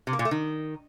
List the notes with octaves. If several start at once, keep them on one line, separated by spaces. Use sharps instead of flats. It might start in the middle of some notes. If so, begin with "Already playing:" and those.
C3
A#3
A#2
A3
D#3